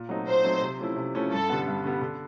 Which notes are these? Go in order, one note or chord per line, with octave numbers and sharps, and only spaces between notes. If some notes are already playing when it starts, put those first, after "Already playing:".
Already playing: A#2
F#3 A3 C4 D#4
A#2 C5
F#3 A3 C4 D#4
C3
F3 A3 C#4 E4
C3
F3 A3 C#4 E4
G2 A4
D3 G3 B3
G2
D3 G3 B3
D3